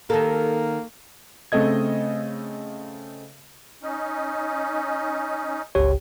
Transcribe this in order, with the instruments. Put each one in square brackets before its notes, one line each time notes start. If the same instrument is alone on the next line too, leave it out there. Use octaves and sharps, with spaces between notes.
[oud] D#3 A4 [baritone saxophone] A#3
[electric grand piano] C#3 A3 C4 A4 D#5 G#6
[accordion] C#4 D#4
[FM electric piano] G1 C#2 G4 [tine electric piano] C#5